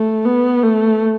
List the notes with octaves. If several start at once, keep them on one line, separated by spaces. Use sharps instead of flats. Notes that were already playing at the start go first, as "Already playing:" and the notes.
Already playing: A3
B3
A3